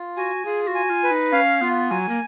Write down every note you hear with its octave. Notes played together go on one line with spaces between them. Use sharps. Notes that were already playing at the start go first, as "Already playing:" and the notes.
Already playing: F4
F#4 G#5
F4 G#4
F#4
G#5
F4
B4
D#4
C#4 F5
B3 F4
F#3 G#5
A#3